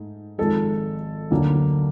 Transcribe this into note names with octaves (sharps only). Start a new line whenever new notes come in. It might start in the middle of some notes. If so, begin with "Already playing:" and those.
Already playing: G#2 A3
G#1 G#2 F3 G#3 A4
D2 D3 F#3 A#3